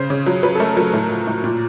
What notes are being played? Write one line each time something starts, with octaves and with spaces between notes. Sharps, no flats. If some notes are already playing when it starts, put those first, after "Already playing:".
Already playing: C#3 C5
C#3
F#3
F#3 B4
A4
A3 A#4
F#3 A#4
A2
F3
A2
A#2